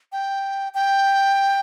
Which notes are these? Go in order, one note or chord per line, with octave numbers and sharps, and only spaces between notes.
G5
G5